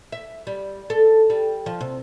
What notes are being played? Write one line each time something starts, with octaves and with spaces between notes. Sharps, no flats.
E5
G3
A4
G3
F3
C3